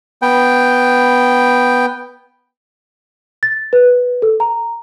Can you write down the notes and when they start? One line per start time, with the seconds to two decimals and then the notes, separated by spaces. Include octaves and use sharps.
0.22 B3 G5
3.43 A6
3.73 B4
4.22 A4
4.40 A#5